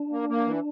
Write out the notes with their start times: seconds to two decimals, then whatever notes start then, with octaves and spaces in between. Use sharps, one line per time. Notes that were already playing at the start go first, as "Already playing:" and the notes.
Already playing: D4
0.12 A#3
0.29 A#3
0.46 E3